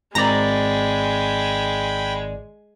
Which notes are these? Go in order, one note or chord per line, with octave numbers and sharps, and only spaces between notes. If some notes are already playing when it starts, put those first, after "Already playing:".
G#1 G#3 D5 G5 A#5 B5